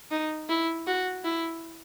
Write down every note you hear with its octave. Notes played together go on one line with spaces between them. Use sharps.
D#4
E4
F#4
E4